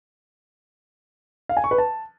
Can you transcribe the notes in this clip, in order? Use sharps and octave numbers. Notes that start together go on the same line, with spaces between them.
F5
G#5
C#6
B4
A5